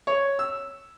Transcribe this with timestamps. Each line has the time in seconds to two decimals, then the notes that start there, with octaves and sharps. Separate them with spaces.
0.07 C#5
0.39 E6